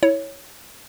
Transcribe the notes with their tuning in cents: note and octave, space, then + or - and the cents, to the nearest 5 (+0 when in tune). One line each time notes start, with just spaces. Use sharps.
E4 -20 C#5 +0